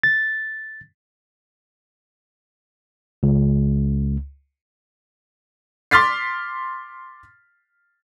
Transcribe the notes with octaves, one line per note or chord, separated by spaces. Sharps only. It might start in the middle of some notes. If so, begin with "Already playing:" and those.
A6
C#2
C6 D6 F6 A6 B6 C7